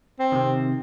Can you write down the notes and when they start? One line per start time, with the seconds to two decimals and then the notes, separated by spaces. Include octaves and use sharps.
0.19 C4
0.32 C3 D#3